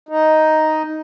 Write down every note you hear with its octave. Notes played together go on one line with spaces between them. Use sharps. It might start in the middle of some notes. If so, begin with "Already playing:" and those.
D#4